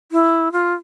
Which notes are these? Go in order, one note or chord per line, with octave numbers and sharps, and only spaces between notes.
E4
F4